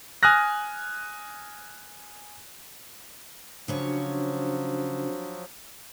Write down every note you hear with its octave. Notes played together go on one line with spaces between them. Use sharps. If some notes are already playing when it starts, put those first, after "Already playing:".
G#5 D#6 F6 F#6 A#6
C#3 F3 F#3 C#4 D4 F#4 C5 C#5